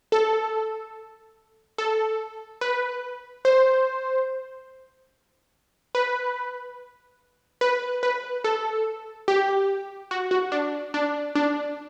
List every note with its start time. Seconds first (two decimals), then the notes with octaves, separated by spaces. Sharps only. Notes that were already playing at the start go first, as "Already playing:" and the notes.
0.12 A4
1.78 A4
2.61 B4
3.45 C5
5.95 B4
7.61 B4
8.03 B4
8.44 A4
9.28 G4
10.11 F#4
10.31 F#4
10.52 D4
10.94 D4
11.35 D4